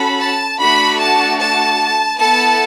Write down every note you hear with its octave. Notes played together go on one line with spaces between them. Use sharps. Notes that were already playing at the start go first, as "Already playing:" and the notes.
Already playing: C#4 F#4 A4 B5
A5
A3 D4 F#4 B5
A5
A5
B3 E4 A4 A5